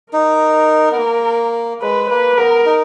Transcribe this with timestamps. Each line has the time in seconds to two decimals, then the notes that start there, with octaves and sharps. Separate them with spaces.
0.13 D#4 A#4
0.91 B3
0.98 A#3
1.81 G#3 B4
2.09 A#3 B4
2.38 B3 A#4
2.66 D#4